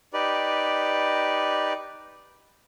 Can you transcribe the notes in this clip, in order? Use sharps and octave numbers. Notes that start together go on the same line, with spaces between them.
D#4 G4 B4 D5